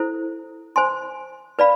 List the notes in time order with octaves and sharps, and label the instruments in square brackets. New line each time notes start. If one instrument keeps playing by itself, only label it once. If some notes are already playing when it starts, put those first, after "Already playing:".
Already playing: [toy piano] E4 A4 C5
C5 G#5 C6
B4 D5 F5 B5